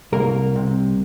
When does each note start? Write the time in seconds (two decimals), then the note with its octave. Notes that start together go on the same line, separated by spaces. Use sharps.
0.12 C2 A#3 A#4
0.56 C3